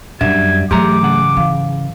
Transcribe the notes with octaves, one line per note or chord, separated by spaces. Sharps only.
F#2 F#3 G3 D4 E5 G#6
G#2 E3 F#3 A3 G4 A#5 D6
C#3 F#5
E3 F5